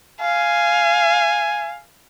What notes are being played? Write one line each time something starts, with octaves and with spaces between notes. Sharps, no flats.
F5 G#5